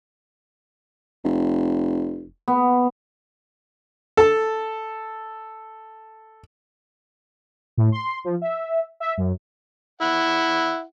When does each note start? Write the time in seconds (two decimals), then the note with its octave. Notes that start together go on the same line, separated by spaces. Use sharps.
1.25 F1
2.48 B3
4.17 A4 A5
7.77 A2
7.92 C6
8.24 F3
8.42 E5
9.00 E5
9.18 F#2
10.01 E4 F#5